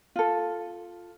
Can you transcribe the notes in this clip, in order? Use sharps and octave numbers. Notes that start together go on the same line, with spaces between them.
F4 A4